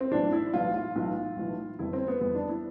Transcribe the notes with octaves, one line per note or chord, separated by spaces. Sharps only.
C4
B1 A2 E3 D4
E4
B1 A2 E3 F4
F4
B1 A2 E3
B1 A2 E3
G1 F2 E3 E4
C4
B3
G1 F2 E3 B3
D4
E4